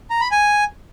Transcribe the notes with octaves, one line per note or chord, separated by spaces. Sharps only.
A#5
B5
G#5